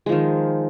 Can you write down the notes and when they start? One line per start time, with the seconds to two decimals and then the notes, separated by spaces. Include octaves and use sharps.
0.06 G#3
0.09 F3
0.12 D#3